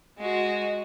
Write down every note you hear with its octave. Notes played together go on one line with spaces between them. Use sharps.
G#3 F#4